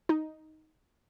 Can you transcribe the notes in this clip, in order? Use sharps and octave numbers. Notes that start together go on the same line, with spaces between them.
D#4